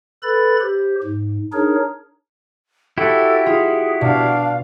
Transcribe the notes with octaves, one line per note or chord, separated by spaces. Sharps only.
A4 B4 B5 A6
G4 C5
G#2
D4 D#4 G#4 A#4 C#5
E4 F#4 G4 A4
F4 G#4
B2 D4 F5